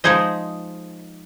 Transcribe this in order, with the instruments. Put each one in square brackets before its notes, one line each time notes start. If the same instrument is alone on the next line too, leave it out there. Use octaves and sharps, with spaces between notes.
[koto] F3 G#3 D#4 G#4 C5 D#5